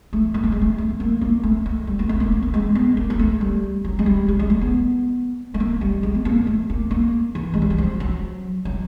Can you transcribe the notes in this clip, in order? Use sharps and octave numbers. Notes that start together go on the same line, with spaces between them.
A3
A#3
A3
G#3
A3
A3
A#3
A#3
A3
A3
G3
A#3
A3
A#3
B3
A#3
G#3
B3
A#3
A#3
A3
G3
F#3
G#3
G3
G3
G#3
A3
B3
A3
A#3
G3
G#3
B3
A#3
A3
A#3
A#3
E3
G#3
G3
F#3
F3
F#3
F#3